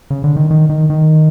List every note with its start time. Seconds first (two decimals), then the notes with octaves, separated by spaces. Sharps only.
0.10 C#3
0.24 D3
0.36 D#3
0.51 D#3
0.70 D#3
0.90 D#3